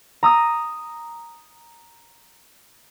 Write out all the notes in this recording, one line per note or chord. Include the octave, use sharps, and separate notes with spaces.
A#5 D#6 E6 A#6